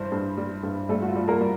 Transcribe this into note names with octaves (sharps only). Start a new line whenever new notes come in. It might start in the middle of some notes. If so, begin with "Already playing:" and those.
Already playing: G2 E3 G3 C5
G2
G3
G2
G3 A3 A4
F#4
F4
G3
A#3 A#4
G3